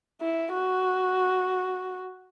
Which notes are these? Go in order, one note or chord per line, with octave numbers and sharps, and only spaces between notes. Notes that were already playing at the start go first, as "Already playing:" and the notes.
E4
F#4